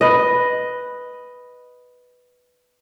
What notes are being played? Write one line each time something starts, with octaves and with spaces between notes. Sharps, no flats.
B4 D#5